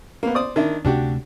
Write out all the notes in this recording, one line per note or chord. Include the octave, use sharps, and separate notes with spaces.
A#3 B3
C5 D5 D#6
D#3 D4 E4
D2 C3 A3 D4 F#4 G4